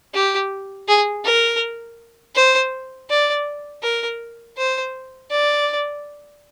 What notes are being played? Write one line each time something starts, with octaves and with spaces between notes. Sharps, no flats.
G4
G#4
A#4
C5
D5
A#4
C5
D5